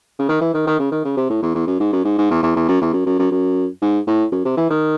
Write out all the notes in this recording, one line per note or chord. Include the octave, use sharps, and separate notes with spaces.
C#3
D#3
E3
D#3
D#3
C#3
D#3
C#3
C3
A2
E2
E2
F#2
G#2
F#2
G#2
G#2
E2
E2
E2
F#2
E2
F#2
F#2
F#2
F#2
G#2
A2
F#2
C3
E3
D#3